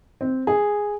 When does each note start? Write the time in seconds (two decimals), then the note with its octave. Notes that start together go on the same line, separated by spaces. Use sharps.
0.21 C4
0.47 G#4